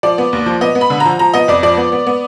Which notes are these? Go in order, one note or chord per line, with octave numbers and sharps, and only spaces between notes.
F3 D5
B3
D#2
F3
B3 D#5
B3
B5
D3
A#5
F3
F3 A#5
B3 D#5
F2 D5
F3 D5
B3
B3
B3